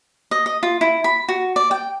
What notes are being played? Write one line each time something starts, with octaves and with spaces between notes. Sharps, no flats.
D#5
D#5
F4
E4
B5
F#4
D5
G5